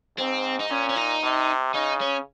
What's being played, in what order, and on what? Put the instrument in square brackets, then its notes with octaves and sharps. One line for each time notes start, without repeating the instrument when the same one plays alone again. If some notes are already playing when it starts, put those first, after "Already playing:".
[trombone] G#2 [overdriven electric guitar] C4
[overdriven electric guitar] D#4
[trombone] A#2 [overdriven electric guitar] C#4
[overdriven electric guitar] C#4
D#4
[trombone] C3
[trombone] C#3 [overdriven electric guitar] D#4
[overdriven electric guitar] C#4